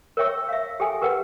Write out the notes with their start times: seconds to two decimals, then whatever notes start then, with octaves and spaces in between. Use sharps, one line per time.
0.17 A#4 C#5 E5 G5 C#6 E6
0.49 E5 F5
0.80 G4 A4 G5 G#5
1.02 G4 A#4 B4 F#5 G5